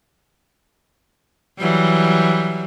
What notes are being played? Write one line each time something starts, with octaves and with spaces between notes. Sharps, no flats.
E3 F#3 G3